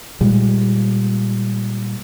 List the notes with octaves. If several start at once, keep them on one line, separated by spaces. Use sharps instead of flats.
A#2 G3 G#3